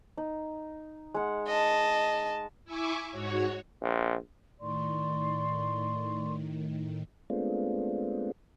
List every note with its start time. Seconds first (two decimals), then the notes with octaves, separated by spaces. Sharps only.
0.17 D#4
1.14 G#3 F#5
1.48 D#5 A5
2.65 E4 E5 G#5 C#6 D6
3.12 G#2 F#4 C#5
3.81 A#1
4.59 A2 D#3 D5 C6 C#6
7.30 G#3 A3 B3 C4 D4 F4